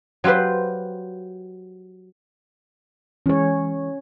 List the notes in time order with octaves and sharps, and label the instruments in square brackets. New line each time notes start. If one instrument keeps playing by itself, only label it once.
[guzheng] F#3 F4 G4 B4 C5
[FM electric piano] E3 G#3 [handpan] C#4 C#5